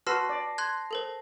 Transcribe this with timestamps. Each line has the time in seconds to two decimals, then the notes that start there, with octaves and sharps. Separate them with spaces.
0.07 F#4 B4 A5 C6 E6 F6 A#6 C7
0.29 D5
0.58 C6 F#6 G#6
0.91 A4 A#4 C5